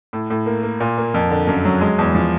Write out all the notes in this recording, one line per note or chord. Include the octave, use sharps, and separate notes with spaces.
A2
A2
A#3
A#3
A#2
A#3
F2
D3
F#2
F#3
G#3
E2
F3